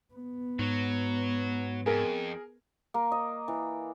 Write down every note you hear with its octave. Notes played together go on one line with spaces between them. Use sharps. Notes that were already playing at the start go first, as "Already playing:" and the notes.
B3
G#2 F#3
F2 G#4 A#4
A#3
D#5
E3